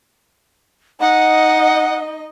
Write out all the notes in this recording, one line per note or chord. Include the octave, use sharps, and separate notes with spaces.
D#4 D#5 F#5